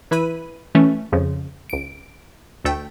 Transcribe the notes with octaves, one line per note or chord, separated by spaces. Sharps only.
E3 E4 B4 B5 D#7
E3 A3 C#4
F2 C#3 F3
C#2 D7
D2 A3 G5